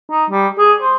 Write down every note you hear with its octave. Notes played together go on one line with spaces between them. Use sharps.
D#4
G3
G#4
C5